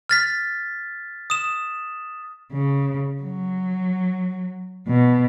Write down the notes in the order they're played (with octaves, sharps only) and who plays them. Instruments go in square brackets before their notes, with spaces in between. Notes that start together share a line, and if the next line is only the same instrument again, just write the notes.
[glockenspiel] F6 A6 B6
D#6 E7
[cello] C#3
F#3
B2